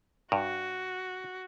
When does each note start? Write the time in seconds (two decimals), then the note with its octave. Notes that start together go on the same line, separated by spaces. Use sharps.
0.32 G2 F#4